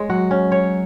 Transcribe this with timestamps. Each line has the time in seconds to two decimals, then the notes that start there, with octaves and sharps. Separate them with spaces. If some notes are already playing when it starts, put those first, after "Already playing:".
Already playing: G#3 C#5
0.09 F#3 F#4
0.31 C#4
0.52 C#5